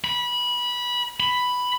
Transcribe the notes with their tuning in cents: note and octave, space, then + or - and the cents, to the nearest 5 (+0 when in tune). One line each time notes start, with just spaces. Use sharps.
B5 -20
B5 +5